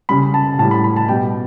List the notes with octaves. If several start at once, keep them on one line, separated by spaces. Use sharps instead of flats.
C#3 G3 B5
A5
A2 G3 A5
B5
B5
A5
B2 G3 G5